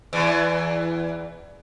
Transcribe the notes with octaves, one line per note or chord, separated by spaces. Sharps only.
E2 E3